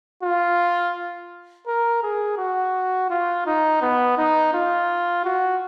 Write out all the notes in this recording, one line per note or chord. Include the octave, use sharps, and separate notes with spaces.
F4
A#4
G#4
F#4
F4
D#4
B3
D#4
F4
F#4